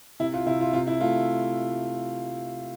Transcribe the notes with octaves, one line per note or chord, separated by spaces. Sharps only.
C3 E4
F4
C3 E4
F4
C3 F4
E4
A3 F4